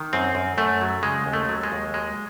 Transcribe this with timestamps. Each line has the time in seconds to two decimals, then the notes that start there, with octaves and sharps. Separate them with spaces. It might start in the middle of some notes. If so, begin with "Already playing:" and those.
Already playing: D#3
0.13 F#2 C4
0.35 F#2
0.57 F#2 A3
0.81 F#3
1.03 C#3 G#3
1.26 D#2
1.33 A3
1.49 F#3
1.63 G#3
1.72 D#2
1.94 F#3 G#3